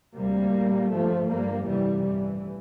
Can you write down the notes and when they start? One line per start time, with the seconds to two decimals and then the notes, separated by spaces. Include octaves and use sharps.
0.15 D2 C3 G3 A#3
0.53 A#1 A2
0.91 G1 G2 F3 A3
1.28 G1 G2 G3 A#3
1.65 G1 F2 C3 E3 G3
2.03 A1 G2 E3